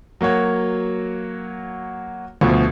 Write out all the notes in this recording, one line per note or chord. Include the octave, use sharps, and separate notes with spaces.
F#3 A#3 F#4 C#5
D2 B2 F3